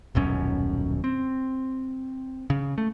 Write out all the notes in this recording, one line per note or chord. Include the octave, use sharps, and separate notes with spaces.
D#1 B1 F#2 C#4
C4
C#3
A3